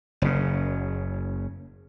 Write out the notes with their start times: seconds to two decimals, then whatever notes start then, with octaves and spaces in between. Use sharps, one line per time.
0.22 F#1 C#3